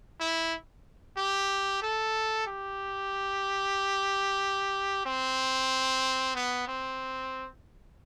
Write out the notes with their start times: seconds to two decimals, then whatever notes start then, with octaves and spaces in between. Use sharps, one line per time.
0.20 E4
1.17 G4
1.82 A4
2.47 G4
5.06 C4
6.35 B3
6.67 C4